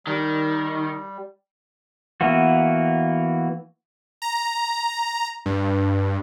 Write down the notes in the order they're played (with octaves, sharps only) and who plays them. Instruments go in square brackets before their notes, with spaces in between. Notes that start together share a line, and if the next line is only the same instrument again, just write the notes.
[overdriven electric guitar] D#3 [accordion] G3
[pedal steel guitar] E3 A#3 B3 F#4
[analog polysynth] A#5
G2